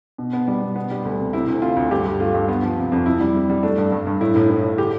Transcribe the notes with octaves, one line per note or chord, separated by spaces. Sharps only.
B2
B3
G3
B2
B3
G3
D2
C3
C3 E4
D2
C3 F4
D2
G2 G4
G2
A3 F4
G2
B3
F3
C3
F2
C3 E4
G3
G3
G3
A3 D4
G2
G2
G2
A2 E4
A2
A2
A2
D3 G4